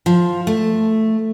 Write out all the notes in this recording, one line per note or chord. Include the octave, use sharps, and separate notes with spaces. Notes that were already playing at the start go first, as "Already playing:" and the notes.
F3
A3